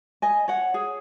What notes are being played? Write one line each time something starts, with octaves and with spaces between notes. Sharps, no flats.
D#5 G#5
C#5 F#5
G#4 C#5